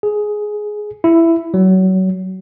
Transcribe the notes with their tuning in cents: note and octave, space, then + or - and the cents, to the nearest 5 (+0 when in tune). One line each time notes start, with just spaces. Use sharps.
G#4 +10
E4 +10
F#3 +25